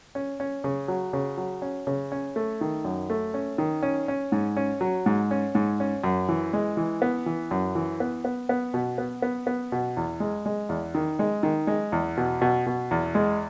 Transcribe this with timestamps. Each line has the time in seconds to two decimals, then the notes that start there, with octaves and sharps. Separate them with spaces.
0.15 C#4
0.40 C#4
0.64 C#3
0.88 F#3
1.13 C#3
1.38 F#3
1.62 C#4
1.87 C#3
2.12 C#4
2.36 A3
2.61 D#3
2.85 F#2
3.10 A3
3.34 C#4
3.58 D#3
3.83 C#4
4.08 C#4
4.32 G#2
4.57 C#4
4.81 F#3
5.06 G#2
5.31 C#4
5.55 G#2
5.80 C#4
6.04 F#2
6.29 E3
6.53 G#3
6.77 E3
7.02 B3
7.26 E3
7.51 F#2
7.75 E3
8.00 B3
8.25 B3
8.49 B3
8.74 B2
8.98 B3
9.22 B3
9.47 B3
9.72 B2
9.97 E2
10.20 G#3
10.46 G#3
10.69 E2
10.95 D#3
11.19 G#3
11.43 D#3
11.67 G#3
11.92 E2
12.17 B2
12.41 B2
12.66 B2
12.91 E2
13.15 G#3